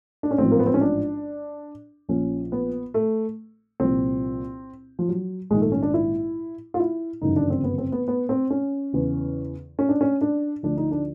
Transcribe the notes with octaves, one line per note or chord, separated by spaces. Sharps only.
D4
C#4
A1 G#2 F3 C4
A#3
B3
C4
C#4
D4
A#1 A#2 F3 C#4
B3
A3
C2 A#2 F3 C4
F3
F#3
A#1 G#2 D#3 G#3
A3
C#4
D4
E4
F4
E4
G1 F#2 C#3 E3 D#4
D4
C4
B3
C4
B3
B3
C4
C#4
E2 C#3 E3
C#4
D4
C#4
D4
D2 D3 F3 D4
D#4
D4